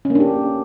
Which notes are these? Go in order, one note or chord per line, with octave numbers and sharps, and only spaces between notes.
C#4
A#3
D4
G4